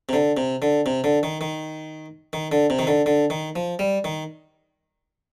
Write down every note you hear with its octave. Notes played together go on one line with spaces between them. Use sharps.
C3
D3
C3
D3
C3
D3
D#3
D#3
D#3
D3
C3
D#3
D3
D3
D#3
F3
G3
D#3